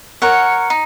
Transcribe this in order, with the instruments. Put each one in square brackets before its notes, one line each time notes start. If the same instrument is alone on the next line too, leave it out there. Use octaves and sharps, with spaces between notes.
[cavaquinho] A#4 C#5 F#5
D#4